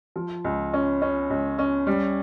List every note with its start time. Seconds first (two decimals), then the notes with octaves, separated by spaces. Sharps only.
0.16 F3
0.44 C#2
0.73 C#4
1.02 C#4
1.30 C#2
1.59 C#4
1.87 G3